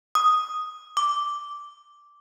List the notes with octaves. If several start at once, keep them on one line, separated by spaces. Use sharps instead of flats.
D#6
D6